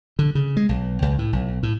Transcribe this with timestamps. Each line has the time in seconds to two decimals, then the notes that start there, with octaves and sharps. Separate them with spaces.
0.19 D3
0.35 C#3
0.57 G#3
0.69 B1
1.02 C#2
1.19 A2
1.33 B1
1.63 A2